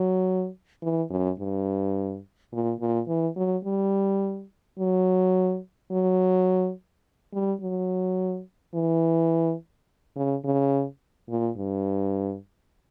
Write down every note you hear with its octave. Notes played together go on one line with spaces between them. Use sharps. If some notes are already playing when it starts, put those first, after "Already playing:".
Already playing: F#3
E3
F#2
G2
A#2
A#2
E3
F#3
G3
F#3
F#3
G3
F#3
E3
C#3
C#3
A#2
G2